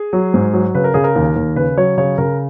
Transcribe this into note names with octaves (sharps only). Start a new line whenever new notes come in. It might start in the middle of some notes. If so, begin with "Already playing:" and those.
Already playing: G#4
F#3
G#2
F#3
C#3 B4
A#4
C#3 G#4
A#4
D#2
D#2
C#3 B4
F#3 C#5
C#3 C#5
C#3 A#4